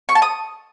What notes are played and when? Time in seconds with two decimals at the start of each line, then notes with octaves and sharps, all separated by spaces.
0.09 C#6
0.15 A5
0.22 D#6